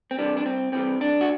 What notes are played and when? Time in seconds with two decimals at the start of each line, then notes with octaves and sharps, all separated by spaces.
0.11 C4
0.18 C3 E3 G3 D4
0.37 D4
0.45 C2 C4
0.72 C3 E3 G3 C4
1.00 C2 D4
1.21 F#4